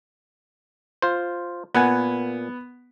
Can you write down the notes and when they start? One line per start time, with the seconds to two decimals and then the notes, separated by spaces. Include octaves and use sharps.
1.02 F4 C5
1.74 A#2 B3 F#5 G#5